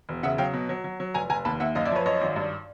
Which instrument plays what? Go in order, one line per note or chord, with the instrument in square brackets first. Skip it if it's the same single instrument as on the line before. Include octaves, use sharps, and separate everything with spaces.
[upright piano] E1
C#3 E5 F#5
F#3 F5 G5
B2
F#3
F#3
F#3
F1 G#5 A#5
F1 G#5 A#5
D#2 A5 B5
D#2 E5 F#5
F#2 D#5 F5
D5 E5
F3 B4 C#5
F#2 C#5 D#5
G#1
G2